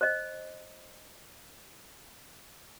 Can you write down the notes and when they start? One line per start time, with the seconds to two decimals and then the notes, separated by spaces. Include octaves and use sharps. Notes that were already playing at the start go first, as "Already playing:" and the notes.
0.01 C5 D#5